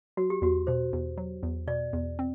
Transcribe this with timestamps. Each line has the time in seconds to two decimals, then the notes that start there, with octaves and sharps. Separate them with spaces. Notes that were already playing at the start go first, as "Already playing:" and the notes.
0.17 F#3 F#4
0.30 G4
0.42 E2 F#4
0.67 B2 C5
0.93 E2
1.17 F#3
1.43 E2
1.67 B2 D5
1.93 E2
2.19 C4